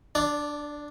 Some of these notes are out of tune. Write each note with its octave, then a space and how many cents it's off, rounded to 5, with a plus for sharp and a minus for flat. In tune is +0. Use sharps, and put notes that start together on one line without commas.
D4 +0 D5 -25